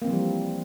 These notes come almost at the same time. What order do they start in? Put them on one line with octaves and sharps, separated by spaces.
A#3 C4 E3 F3 G3